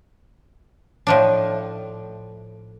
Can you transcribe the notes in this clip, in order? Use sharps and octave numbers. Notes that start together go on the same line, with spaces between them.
A2 F3 D4